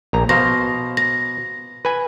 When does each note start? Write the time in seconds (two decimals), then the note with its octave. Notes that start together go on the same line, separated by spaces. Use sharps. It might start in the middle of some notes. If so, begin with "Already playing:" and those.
0.13 A#1 A#5
0.29 B2 C5 F5 A#6
0.97 A#6
1.85 B4 G#5